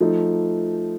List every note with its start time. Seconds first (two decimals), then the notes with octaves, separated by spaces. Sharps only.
0.01 F3 A3 D#4